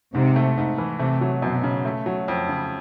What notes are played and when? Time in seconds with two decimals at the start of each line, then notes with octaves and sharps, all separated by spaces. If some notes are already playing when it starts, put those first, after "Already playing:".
0.14 G#2 C3
0.36 A3
0.58 G#2
0.78 E3
0.99 C3 A3
1.21 F#3
1.42 F#2 B2
1.63 C#3
1.85 A3
2.06 F#3
2.28 F2
2.49 C#3